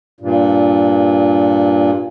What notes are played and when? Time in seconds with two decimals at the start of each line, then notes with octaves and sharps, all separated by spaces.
0.21 G2 A#2